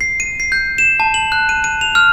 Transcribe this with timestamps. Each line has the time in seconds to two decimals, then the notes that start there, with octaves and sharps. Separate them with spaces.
0.01 C7
0.20 D#7
0.40 C7
0.52 G6
0.78 E7
1.00 A5
1.14 F#7
1.32 F#6
1.49 D#7
1.64 D#7
1.81 F7
1.95 F6